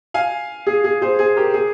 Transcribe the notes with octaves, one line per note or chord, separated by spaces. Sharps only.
F5 G#5
G#4
G#4
G#4 C5
G#4
G4 A#4
G#4